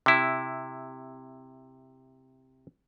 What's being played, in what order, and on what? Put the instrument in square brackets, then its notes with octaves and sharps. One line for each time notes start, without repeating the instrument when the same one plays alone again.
[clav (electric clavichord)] C3 E4